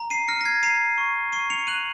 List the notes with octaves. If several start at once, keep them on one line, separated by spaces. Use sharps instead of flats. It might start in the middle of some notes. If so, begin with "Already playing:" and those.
Already playing: A#5
C7 D#7
F6 A#6 C#7
A#6
G#6 C7
A#5 C7 D#7
C#6
C#6 C7 D#7
C#7 F7
F#6 D#7 F#7